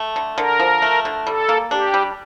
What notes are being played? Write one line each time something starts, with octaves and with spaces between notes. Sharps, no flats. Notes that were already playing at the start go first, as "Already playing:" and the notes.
Already playing: A3
D3
D3 A#4
F3
A3
D3
G3 A4
A#3
D4 G4
G3